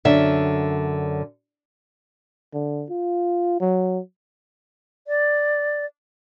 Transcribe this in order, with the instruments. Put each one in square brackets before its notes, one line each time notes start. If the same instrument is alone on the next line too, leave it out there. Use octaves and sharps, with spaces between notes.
[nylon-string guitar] F#2 D3 E5
[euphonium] D3
F4
F#3
[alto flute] D5